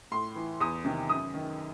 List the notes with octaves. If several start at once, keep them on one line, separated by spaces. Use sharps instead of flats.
A2 C6
E3
E2 D#6
C3 D#3
F#2 D#6
D#3